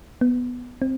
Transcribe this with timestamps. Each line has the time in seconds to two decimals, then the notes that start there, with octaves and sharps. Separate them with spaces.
0.21 B3
0.82 C4